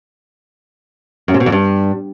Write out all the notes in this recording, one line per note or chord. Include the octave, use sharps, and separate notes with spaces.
F#2
C3
B2
F2
G2